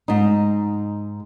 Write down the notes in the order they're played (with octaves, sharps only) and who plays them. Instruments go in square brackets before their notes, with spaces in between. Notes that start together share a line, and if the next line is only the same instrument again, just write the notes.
[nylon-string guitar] G#2 D#4